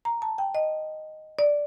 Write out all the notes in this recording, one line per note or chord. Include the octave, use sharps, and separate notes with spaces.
A#5
A5
G5
D#5
D5